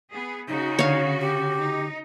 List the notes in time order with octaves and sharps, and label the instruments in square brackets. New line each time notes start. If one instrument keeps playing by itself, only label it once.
[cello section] B3 G#4
[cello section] C#3 C#4 F#4 [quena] D#4
[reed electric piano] D3 [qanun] C#5 F5
[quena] G4
[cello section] D#4